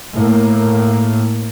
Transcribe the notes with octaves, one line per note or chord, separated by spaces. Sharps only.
A2 A#3